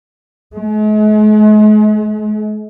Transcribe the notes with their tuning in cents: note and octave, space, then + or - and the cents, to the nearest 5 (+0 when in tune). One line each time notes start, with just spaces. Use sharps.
G#3 +45